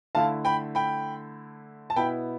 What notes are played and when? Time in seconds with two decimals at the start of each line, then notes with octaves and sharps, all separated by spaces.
0.15 D3 A3 E4 F5 A5
0.45 G5 B5
0.75 G5 B5
1.90 A5
1.96 B2 B3 E4 G5 B5